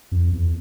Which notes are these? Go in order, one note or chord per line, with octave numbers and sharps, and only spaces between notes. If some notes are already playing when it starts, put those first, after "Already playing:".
F2
E2